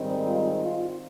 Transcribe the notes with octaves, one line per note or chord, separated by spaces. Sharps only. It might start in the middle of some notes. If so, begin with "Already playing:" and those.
Already playing: G#2 D#3 G3 C4 D#4
F4
F4